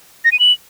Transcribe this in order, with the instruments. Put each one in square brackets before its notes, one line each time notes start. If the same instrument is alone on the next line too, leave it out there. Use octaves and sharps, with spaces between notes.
[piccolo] A#6
D#7
F#7